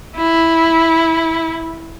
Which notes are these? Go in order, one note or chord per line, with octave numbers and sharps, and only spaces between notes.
E4